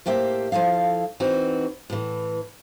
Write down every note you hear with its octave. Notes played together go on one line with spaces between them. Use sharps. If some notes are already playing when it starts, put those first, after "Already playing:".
A2 A#3 G4 C5 E5
F3 E4 A4 F5
E3 C4 D#4 F#4
A2 E3